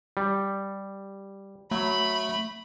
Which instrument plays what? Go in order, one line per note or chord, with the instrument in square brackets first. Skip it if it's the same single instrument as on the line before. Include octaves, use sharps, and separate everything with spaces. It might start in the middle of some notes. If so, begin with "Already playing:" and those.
[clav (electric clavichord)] G3
[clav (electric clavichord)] F#3 E5 [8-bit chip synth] A3 [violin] B5